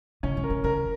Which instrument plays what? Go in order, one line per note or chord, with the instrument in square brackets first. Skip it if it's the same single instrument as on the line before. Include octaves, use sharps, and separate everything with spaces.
[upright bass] C#3 [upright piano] C#4
[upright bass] C#3
[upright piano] A#4
[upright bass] D#3
[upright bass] C#3 [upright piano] A#4